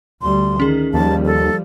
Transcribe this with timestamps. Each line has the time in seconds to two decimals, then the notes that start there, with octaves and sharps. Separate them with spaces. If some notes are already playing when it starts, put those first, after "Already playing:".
0.22 D2 G3 C6
0.60 D#3 C#4 G#4
0.94 D#2 F3 G3 A5
1.25 A4